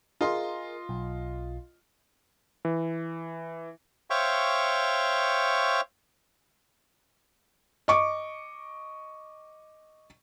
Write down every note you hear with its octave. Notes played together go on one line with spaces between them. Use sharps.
F4 G#4 A#4 D#5 C6
B1
E3
C5 C#5 E5 F5 G5 C#6
D#5 C#6 D6